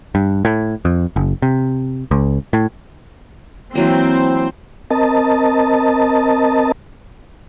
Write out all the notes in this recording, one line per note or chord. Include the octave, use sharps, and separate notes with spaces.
G2
A2
F2
F#1
C3
C#2
A2
E3 F#3 A#3 C4 C5
C4 A#4 D#5 A5